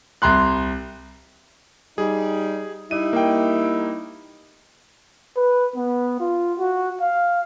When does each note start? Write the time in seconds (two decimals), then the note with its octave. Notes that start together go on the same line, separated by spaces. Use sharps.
0.22 C2 A#5 C6 F#6
1.98 G3 D#4 G#4
2.91 G3 D#4 E4 D#7
3.13 A#3 G5
5.37 B4
5.76 B3
6.20 F4
6.59 F#4
7.01 F5